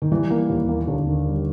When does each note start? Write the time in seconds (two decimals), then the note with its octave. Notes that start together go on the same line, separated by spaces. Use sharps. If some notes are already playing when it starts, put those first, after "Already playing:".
0.02 D#3
0.12 E3 G3
0.30 A#3
0.49 D#2
0.69 A#3
0.87 D#2 D3
1.07 D#3
1.26 G3